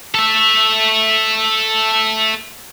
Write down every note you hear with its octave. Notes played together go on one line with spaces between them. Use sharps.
A4 E5